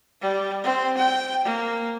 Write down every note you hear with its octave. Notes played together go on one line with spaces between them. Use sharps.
G3
C4
G5
A#3